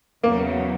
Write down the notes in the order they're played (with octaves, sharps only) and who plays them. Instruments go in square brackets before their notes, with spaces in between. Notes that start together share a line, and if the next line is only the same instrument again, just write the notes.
[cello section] E2 C#3 F#3 [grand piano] A#3